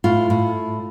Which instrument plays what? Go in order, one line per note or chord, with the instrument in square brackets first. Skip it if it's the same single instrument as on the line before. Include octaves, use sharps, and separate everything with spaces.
[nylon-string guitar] A2 F4
A2